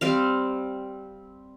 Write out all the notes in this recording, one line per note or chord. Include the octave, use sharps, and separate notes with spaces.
G3 C4 F5